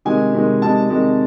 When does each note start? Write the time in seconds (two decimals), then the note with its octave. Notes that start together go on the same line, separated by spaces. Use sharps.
0.05 C3 D#3 G#3 G#5
0.33 C3 D#3 G#3
0.62 C3 D#3 G#3 A5
0.90 C3 D#3 G#3